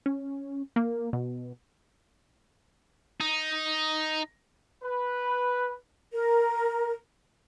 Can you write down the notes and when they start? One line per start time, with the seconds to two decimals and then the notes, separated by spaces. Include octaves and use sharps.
0.06 C#4
0.76 A#3
1.13 B2
3.20 D#4
4.83 B4
6.12 A#4